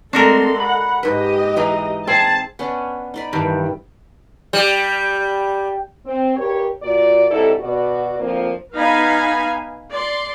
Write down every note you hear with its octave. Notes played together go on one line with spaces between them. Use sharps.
G#3 A3 C4 D4 F#4 A4 A#4 C6
F#5 B5
G#2 G4 B4 D#5
E3 D#4 G#4
C4 G#4 A5
B3 C#4 D4
D#4 D5 B5
G2 D#3 E3
G3
C4
G2 G4 A#4 C#5
A#2 F4 F#4 D5
G#2 C3 D4 E4 A4
B2 F#4 D5
D2 F3 A#3 C4 D4 F4
B3 D#4 F5 G#5 B5
D5 C6